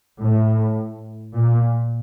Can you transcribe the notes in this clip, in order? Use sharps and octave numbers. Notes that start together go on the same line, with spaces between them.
A2
A#2